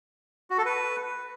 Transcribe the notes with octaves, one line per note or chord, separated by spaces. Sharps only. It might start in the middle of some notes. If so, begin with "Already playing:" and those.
F#4
A4
B4